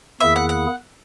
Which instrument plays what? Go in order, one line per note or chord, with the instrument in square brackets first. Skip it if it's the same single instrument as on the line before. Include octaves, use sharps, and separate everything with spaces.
[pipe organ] E2 D#3 A#3 E4 G#4 [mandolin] E5
[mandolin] F#5
F#5